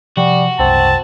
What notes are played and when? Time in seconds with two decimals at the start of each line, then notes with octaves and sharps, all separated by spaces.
0.17 C3 F3 G3 F#4
0.59 F#1 C2 C4 A5